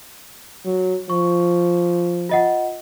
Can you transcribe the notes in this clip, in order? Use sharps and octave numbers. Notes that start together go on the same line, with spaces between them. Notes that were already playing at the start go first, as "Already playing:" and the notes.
F#3
F3 C#6
F4 D#5 F#5